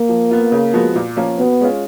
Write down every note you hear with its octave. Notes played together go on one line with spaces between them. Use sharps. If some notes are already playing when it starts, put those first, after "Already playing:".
Already playing: A#3
F3
B3 F4
C#3
F3 G#3 B3 F#4
A#2
F3 A#3 C#4
B2 B3
G#3 C#4 F4